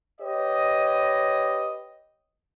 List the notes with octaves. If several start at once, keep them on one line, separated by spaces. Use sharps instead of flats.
G4 B4 C#5 D#5